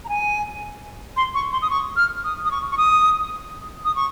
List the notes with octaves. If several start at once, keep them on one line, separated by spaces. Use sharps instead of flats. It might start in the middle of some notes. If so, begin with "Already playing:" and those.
A#5
G#5
C6
C#6
C6
D#6
C#6
F6
D#6
D#6
C#6
C#6
D#6
D#6
C#6